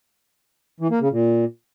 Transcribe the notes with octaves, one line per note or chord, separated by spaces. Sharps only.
E3
A#3
C#3
A#2